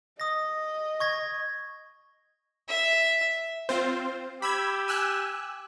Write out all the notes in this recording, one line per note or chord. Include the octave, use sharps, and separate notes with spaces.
D#5 D#6 A#6
C#6 G#6 A#6
E5
C4 F4 C5
G4 B5 E6 G#6
G#5 E6 F#6